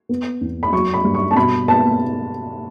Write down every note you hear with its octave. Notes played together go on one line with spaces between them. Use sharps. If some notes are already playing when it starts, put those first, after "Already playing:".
B3
E2
B5
F#3 C#6
B5
G2
C#6
A5
B2 B5
B3 A5